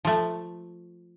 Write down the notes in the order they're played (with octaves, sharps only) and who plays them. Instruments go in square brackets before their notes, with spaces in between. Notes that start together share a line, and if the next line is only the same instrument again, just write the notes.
[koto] F3 A3